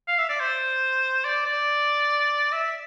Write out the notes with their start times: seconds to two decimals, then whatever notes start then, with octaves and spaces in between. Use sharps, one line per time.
0.08 F5
0.18 E5
0.29 D5
0.40 C5
1.25 D5
1.46 D5
2.52 E5